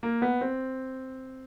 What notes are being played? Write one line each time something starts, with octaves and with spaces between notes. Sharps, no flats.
A#3
B3
C4